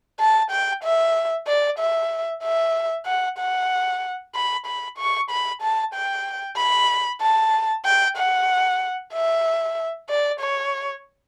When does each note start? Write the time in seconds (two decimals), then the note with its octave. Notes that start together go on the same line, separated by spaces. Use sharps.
0.20 A5
0.50 G5
0.84 E5
1.47 D5
1.79 E5
2.43 E5
3.06 F#5
3.38 F#5
4.35 B5
4.66 B5
4.98 C#6
5.30 B5
5.62 A5
5.94 G5
6.57 B5
7.21 A5
7.85 G5
8.17 F#5
9.13 E5
10.09 D5
10.40 C#5